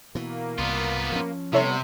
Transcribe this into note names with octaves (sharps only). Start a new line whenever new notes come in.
B2 E3 A#3
C2 B3 F4
F3 C#4
C3 G3 B3 E4 A4 C#5